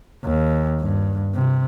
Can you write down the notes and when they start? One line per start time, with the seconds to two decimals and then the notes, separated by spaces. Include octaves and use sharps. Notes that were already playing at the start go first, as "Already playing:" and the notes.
0.24 D#2
0.80 G2
1.34 C3